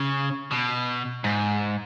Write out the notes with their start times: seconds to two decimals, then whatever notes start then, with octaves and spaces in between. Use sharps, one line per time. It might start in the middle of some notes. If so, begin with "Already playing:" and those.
Already playing: C#3
0.51 B2
1.24 G#2